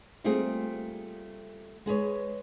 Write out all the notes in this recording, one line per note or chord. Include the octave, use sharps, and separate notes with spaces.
G3 A3 A#3 C4 F4 G#4
G#3 G#4 B4 C#5